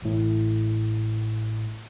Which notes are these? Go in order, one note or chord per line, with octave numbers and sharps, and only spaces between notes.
A1 A2